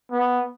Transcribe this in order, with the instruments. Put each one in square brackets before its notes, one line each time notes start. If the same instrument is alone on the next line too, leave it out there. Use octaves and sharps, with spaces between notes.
[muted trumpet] B3